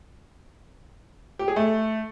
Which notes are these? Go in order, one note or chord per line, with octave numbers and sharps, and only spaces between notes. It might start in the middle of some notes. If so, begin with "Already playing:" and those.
G4
G#4
A3